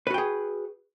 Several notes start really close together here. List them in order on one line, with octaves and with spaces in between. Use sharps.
B4 F#4 G5 G#4